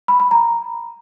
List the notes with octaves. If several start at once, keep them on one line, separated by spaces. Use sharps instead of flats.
B5
B5
A#5